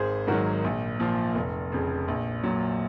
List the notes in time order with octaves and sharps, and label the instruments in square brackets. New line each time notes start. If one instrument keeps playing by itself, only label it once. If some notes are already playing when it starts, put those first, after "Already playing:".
Already playing: [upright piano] G#1 G#4 C5
G#2 D#3 F#3 F#4 A#4
A#1
A#2 F3
F1
F2 C#3
A#1
A#2 F#3